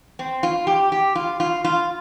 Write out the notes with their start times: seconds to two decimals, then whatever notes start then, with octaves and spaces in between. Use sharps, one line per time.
0.19 C4
0.43 F4
0.67 G4
0.92 G4
1.15 F4
1.40 F4
1.64 F4